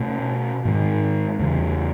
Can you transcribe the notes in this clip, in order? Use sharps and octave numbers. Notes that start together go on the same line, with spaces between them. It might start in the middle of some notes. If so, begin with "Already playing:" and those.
Already playing: B2 A3 C#4
G#2 D#3 G#3
E2 C#3 E3